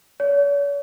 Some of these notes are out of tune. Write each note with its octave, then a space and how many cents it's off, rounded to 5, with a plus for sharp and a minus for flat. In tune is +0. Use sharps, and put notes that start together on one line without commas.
C#5 +45